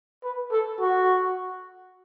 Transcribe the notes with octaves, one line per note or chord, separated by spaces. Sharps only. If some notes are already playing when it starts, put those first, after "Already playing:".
B4
A4
F#4